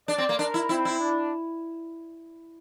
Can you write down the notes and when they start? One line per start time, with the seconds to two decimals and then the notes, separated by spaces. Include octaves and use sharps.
0.08 D4 D5
0.18 C4
0.29 A#3
0.39 D4 A#4
0.54 E4
0.69 C4 E4
0.85 E4
1.00 D4